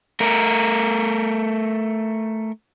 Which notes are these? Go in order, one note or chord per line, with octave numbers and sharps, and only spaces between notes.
A3 A#4